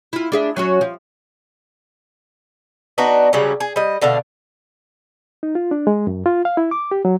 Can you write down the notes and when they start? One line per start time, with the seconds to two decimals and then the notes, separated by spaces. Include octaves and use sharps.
0.13 E4 F4
0.32 D4 G#4 E5
0.57 F#3 C#4 F#4
0.81 F3
2.98 B3 D4 D#4 F#4
3.33 C#3 F#3 G3 C#4
3.60 G#4
3.76 G3 D#5
4.02 B2 D3 A3 F5
5.43 D#4
5.55 F4
5.71 D4
5.87 G#3
6.07 F#2
6.26 F4
6.45 F5
6.57 E4
6.71 D6
6.91 G4
7.05 F#3